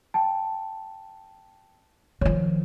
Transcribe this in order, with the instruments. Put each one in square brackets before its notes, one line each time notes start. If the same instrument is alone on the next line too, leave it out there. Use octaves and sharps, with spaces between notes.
[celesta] G5 A5
[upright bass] D#3 F3 [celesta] C#5